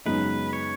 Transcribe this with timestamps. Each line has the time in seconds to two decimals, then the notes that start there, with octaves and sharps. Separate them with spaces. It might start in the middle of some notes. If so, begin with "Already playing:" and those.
0.06 F#2 C#3 G#3 B3 D#4 B4
0.53 C#5